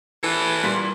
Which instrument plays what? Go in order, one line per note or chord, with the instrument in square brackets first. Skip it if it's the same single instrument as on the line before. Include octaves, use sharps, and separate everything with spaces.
[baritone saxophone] E3 [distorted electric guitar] A4 B4
[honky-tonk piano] A#2 G3